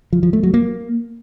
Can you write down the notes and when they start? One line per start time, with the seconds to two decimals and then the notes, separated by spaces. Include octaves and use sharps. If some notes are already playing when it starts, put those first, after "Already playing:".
0.13 F3
0.23 F3
0.33 A3
0.43 F#3
0.54 A#3